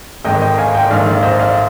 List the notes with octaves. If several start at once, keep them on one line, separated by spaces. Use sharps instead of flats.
G#1 G#2 D#3 D#5 G5
D#5 G5
F5 G#5
D#5 G5
A#1 G#2 D#3 D5 F5
D5 F5
C5 D#5
D5 F5